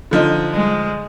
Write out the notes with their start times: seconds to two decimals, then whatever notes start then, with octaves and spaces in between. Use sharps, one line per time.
0.11 D3 F3 D#4
0.53 G#3